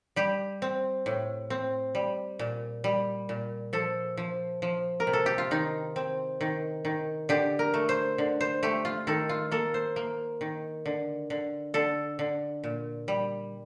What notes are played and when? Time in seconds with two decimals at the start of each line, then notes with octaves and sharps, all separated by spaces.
0.16 G3 G4
0.62 C4
1.06 A2
1.50 C4
1.95 G3
2.39 A#2
2.84 G3
3.29 A#2
3.73 F3 A4
4.17 F3
4.62 F3
5.00 A#4
5.07 C3
5.13 A4
5.26 G4
5.38 F4
5.51 D#3 D#4
5.96 C4
6.41 D#3
6.85 D#3
7.29 D3 G4
7.59 A#4
7.74 A3
7.89 C5
8.18 D3
8.41 C5
8.63 A3 G4
8.85 F4
9.07 D#3 A4
9.29 F4
9.51 A#3 A4
9.74 C5
9.96 A#3
10.41 D#3
10.86 D3
11.30 D3
11.74 D3 A4
12.19 D3
12.64 A#2
13.08 G3